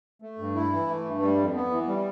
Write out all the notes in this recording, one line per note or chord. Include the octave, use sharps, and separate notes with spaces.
A3
G2
E4
E3
A3
G2
G3
F2
B3
E3
G3